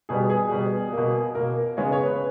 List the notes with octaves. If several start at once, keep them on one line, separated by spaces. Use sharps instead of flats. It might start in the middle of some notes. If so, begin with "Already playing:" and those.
B2 G3 B3 G#4
G#4
B2 G3 B3
B2 A#3
B2 A#3 A#4
C#3 G#3 B3 C#5
C#5
B4